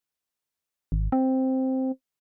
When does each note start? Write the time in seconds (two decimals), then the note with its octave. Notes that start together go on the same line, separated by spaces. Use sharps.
0.92 G#1
1.12 C4